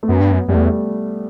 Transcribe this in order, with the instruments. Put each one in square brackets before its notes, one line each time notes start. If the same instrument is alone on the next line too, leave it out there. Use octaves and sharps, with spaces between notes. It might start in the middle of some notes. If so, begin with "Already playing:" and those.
[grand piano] A3
[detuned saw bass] F#2 [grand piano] B3
[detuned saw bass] G2
F#2
[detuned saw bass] F#2 [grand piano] G3
[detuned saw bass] E2 [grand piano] A3